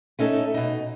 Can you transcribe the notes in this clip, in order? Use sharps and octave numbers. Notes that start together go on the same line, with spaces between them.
A3 C#4 D#4 A4
B2 D#4